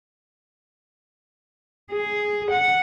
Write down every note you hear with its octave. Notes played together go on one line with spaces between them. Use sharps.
G#4
F#5